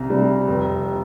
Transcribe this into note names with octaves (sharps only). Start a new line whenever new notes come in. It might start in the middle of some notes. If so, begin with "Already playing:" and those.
Already playing: C2 C3
G3
F1